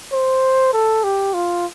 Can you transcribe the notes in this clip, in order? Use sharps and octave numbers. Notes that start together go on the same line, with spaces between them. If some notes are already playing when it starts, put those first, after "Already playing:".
C5
A4
G4
F4